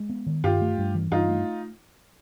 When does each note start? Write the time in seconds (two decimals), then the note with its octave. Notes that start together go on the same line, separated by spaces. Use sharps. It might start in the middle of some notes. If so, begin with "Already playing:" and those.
Already playing: G#3
0.09 B3
0.26 D#3
0.43 G2 F4 G4
0.61 A3
0.78 G2
0.95 E3
1.11 G2 D#4 F4
1.29 A3